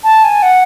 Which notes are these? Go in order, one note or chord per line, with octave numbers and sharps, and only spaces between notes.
A5
G#5
F#5